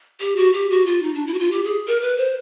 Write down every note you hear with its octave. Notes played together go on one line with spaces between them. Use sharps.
G4
F#4
G4
F#4
F4
D#4
D4
E4
F#4
F4
G4
G#4
A#4
B4
C5